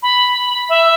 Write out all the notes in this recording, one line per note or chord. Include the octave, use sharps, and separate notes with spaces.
B5
E5